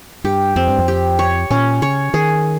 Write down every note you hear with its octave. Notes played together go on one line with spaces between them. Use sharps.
G2 G4
F2 C4
G2
F2
G4
C#5
A#2 C#4
C#3 C#5
D#3 G#4